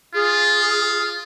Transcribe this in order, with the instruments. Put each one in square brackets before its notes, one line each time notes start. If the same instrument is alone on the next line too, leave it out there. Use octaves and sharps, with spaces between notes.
[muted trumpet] F4 [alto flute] G#4